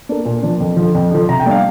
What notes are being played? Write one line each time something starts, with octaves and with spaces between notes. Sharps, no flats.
A#3 D4
A#2
F3 D4
F2
D3 F3
F2
D3 F3
C3 A#5
G5
G3 D4 F5